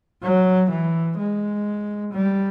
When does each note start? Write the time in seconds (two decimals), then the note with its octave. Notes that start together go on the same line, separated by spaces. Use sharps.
0.22 F#3
0.70 E3
1.18 G#3
2.13 G3